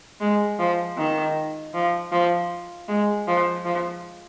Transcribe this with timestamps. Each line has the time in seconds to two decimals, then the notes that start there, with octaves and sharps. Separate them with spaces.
0.21 G#3
0.59 F3
0.98 D#3
1.74 F3
2.12 F3
2.89 G#3
3.27 F3
3.65 F3